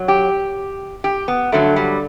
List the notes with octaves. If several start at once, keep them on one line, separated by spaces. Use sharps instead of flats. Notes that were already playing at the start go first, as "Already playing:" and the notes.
Already playing: F#2 F#3
G4
G4
B3
G2 D3 F#3 A3
G3